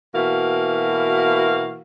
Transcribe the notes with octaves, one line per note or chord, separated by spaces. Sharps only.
B2 E3 A#3 F#4 F5